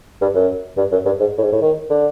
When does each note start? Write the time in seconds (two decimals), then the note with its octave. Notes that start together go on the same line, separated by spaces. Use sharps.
0.21 G2
0.35 F#2
0.77 G2
0.92 F#2
1.05 G2
1.20 G#2
1.38 A2
1.43 G#2
1.52 A2
1.62 D#3
1.90 D3